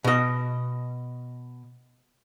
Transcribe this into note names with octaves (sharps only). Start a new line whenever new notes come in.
B2 D#5